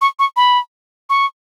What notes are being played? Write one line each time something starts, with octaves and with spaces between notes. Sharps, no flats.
C#6
C#6
B5
C#6